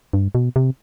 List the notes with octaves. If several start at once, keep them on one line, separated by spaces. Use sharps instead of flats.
G2
B2
C3